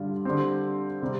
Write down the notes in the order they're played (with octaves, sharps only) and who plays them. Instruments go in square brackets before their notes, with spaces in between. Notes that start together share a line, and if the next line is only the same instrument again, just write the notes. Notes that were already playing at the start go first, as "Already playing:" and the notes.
Already playing: [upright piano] G2 D3 G3 F4
D3 G3 C4
C3 G3 C4